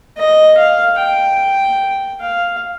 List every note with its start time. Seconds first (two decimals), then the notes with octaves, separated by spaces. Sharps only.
0.17 D#5
0.58 F5
0.99 G5
2.21 F5